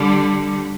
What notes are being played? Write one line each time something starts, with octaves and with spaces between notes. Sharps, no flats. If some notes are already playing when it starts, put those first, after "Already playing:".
Already playing: D3 G3